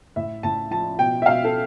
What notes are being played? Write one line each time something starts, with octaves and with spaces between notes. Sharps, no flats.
A2 E5
A2 A5
F3 A5
B2 G5
E5
B2 F5
A4